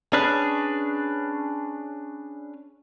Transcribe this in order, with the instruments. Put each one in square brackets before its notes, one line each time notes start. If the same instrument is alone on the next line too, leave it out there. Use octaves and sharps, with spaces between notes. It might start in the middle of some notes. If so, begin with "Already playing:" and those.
[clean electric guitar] C#4 D4 G#4 B4